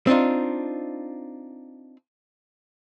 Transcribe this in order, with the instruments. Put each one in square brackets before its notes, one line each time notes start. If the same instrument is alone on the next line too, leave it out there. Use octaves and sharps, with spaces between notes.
[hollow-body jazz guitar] C4 D4 D#4 F4